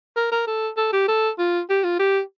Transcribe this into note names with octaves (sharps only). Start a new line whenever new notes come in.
A#4
A#4
A4
A4
G4
A4
F4
G4
F4
G4